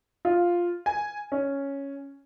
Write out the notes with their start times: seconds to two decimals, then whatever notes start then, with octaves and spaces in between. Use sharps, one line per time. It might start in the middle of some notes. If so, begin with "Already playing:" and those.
0.25 F4
0.86 G#5
1.32 C#4